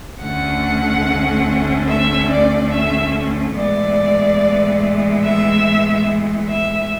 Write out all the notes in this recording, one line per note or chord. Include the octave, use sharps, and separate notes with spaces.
D2 D3 A3 C#4 F#5
E5
D5
E5
A2 E3 G#3 B3 D5
E5
E5